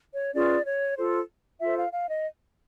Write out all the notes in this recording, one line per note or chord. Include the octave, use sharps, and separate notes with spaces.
C#5
C#4 F4 G#4 B4 D5
C#5
F4 A4 C5
F4 A4 C5 E5
F5
F5
D#5